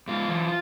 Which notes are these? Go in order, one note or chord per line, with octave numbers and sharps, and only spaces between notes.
G#2 F4
E3